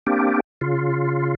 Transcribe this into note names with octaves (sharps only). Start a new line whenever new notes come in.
A#3 C4 D4 G4
C#3 F4